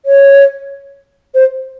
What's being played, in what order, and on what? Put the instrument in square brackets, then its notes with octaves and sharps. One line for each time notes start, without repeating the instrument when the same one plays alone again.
[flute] C#5
C5